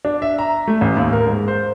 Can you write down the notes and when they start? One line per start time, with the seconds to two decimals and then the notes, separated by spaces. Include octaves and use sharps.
0.05 D4
0.22 E5
0.39 A#5
0.67 A3
0.81 A1
0.96 D#2
1.13 A#4
1.27 G#2
1.48 C5